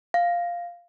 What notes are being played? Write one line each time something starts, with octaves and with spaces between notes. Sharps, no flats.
F5